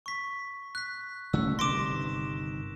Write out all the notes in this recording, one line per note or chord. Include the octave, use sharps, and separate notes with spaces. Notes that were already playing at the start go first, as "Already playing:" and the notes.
C#6 B6
F#6 B6
C#3 A3 C#4 E6
G1 C3 D#3 C6 D6 A#6 D7 E7